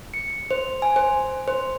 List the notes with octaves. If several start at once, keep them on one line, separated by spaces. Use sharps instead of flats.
C#7
C5
G#5
C5
C5